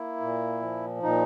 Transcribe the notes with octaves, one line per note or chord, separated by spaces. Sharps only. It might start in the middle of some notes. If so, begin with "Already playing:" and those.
Already playing: A#3 E4
A#2
F3
A#2 D#4